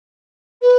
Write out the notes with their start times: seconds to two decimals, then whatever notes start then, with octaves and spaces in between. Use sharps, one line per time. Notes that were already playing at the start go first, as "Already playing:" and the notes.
0.61 B4